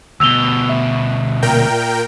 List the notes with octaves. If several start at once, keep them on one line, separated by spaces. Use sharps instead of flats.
D2 B2 E6 F7 G7
E5
A#2 A#4 G5